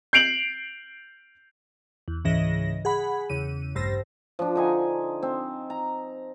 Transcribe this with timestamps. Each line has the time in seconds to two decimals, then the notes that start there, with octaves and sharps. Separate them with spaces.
0.13 G6 C7 D7 F7 F#7
2.08 E2
2.25 C#2 G#2 C#3 E3 D#5 A#6
2.85 G#4 F#5 B5
3.30 E2 C#3 D#7
3.75 A1 G2 C5 E6 A#6
4.39 F3 D4
4.55 D3 D#4 G#5
5.23 C4
5.70 A#5